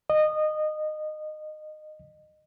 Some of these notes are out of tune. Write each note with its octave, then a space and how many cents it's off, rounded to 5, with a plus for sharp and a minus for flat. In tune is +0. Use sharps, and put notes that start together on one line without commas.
D#5 -20